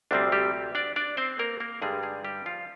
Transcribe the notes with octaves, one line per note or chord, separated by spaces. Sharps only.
D2 C3 G3 C4 D4
G3 G4
D4 D5
D4 D5
C4 C5
A#3 A#4
A#3 A#4
G2 D3 G3 G#3 G#4
G#3 G#4
G3 G4
F3 F4